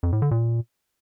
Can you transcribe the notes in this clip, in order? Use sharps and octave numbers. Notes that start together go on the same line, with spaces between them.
F2
A2
D3
A#2